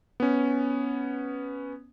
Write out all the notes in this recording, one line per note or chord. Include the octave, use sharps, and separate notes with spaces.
B3 C#4